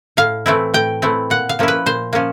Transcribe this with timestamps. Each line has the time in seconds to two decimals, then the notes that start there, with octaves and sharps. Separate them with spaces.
0.17 A2 F5
0.46 E3 A3 C4 E4
0.74 A2 G5
1.02 E3 A3 C4 E4
1.30 A#2 F#5
1.49 F5
1.59 F3 A#3 C#4 E4
1.68 B4
1.86 A#2 C5
2.13 F3 A#3 C#4